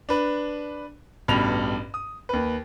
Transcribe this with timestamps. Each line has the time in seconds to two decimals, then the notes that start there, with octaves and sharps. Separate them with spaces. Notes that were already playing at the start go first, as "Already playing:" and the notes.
0.09 D4 B4
1.28 A1 G2 B2 B5 F7
1.94 D#6
2.29 D#2 B4